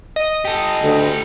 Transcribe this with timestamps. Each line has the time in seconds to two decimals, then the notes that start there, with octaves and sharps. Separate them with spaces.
0.16 D#5
0.45 G4 A4
0.82 D2